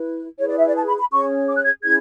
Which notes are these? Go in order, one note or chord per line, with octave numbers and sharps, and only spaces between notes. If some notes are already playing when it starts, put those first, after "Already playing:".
Already playing: E4 B4
E4 G#4 B4 C#5
D5
E5
D5
A5
B5
B5
C#4 G#4 C#5 C#6
D6
F#6
G#6
C#4 E4 G#4 C#5 G#6